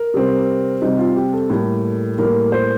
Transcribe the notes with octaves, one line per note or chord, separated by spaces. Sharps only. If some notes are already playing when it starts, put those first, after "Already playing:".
Already playing: A#4
C3 G3 C4
C3 G3 C4 D#4
F4
G4
A4
A2 G3 A#3
A2 G3 A#3 A#4
C5